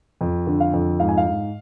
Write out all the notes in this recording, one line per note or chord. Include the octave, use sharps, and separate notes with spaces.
F2
D3
F5
F2
G#2 F5
G#5
F5
G#2